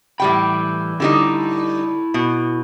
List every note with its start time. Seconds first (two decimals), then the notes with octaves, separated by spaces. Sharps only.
0.20 A2 E3 G3 G5 B5
1.00 D3 G3 D#4 E4 A4
2.14 B2